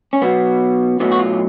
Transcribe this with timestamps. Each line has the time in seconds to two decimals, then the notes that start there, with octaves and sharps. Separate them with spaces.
0.13 C#4
0.22 B1 B2 F#3 B3
1.00 B1 A2 F#3 B3
1.11 F#4
1.19 F4